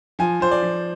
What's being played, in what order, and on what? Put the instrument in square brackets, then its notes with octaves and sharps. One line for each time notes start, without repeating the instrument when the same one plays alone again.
[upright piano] F3 G#5
F3 C5
D5
F3